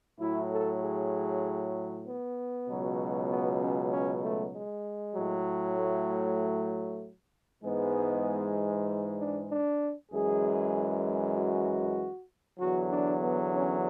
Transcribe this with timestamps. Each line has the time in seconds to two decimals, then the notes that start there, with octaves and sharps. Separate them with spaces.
0.19 A2 F#3 E4
0.50 A4
0.81 G#4
2.06 B3
2.68 C#2 B2 F#3
3.30 B3
3.60 C#4
3.91 C#4
4.22 A3
4.53 G#3
5.15 A2 F#3
5.77 A3
7.63 G#2 E3 G#3 B3
9.18 D4
9.49 D4
10.11 F#2 E3 G#3 G#4
11.35 F#4
12.59 E2 D3 F#3 F#4
12.91 D4
13.21 B3
13.53 C#4